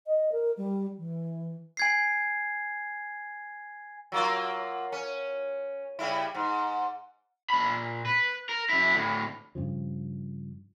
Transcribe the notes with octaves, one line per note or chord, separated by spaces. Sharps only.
D#5
A#4
G3
E3
G#5 G#6 C7
F#3 A#3 F4
C#4
C#3 G3 E4
G#2
A#2 B5
B4
A#4
F#2 E4
D2 A2
G2 C#3 F3